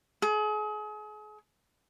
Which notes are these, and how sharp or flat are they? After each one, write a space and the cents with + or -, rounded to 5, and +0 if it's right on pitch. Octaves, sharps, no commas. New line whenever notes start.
G#4 +35